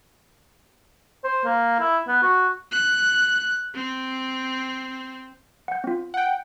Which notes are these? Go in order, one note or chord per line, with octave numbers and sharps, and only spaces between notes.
C5
A#3
E4
B3
F#4
F#6
C4
F#5 G6
C4 F4
F#5 G5